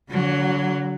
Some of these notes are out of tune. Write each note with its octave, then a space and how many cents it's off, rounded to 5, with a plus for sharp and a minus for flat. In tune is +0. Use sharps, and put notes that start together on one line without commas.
D3 -40 F#3 +0